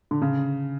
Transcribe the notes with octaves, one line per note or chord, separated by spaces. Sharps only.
D3
C#3